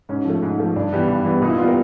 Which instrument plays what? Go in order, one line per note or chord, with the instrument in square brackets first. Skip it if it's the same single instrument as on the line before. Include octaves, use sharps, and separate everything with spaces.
[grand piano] G#2 C#4
F3 A3
G#2
F3 A3
G2 D4
E3 G3 B3
G2
E3 G3 B3
A#2 D#4
E4
B3 F4
G3 A#4